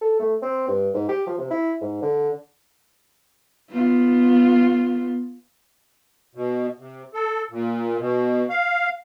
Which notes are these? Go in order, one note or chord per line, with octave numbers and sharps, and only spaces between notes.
A4
A3
C4
G2
G#2
G4
F3
C3
E4
G#2
D3
B3 F4
B2
C3
A4
A#2
B2
F5